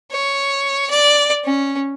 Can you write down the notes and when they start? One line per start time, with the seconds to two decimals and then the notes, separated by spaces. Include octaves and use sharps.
0.11 C#5
0.90 D5
1.44 C#4